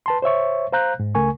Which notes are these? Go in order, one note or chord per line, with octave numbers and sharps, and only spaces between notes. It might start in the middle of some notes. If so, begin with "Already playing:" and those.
B4 A5 C6
C5 C#5 E5 C#6
C5 F5 A#5 F#6 G6
G#2
C#2 C#3 A3 A#4 G#5 C#6